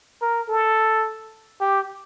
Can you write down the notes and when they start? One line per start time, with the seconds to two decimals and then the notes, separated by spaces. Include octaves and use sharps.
0.22 A#4
0.49 A4
1.61 G4